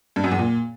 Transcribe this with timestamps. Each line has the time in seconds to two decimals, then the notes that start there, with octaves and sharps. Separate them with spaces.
0.16 G2
0.24 F#2
0.31 E2
0.39 A#2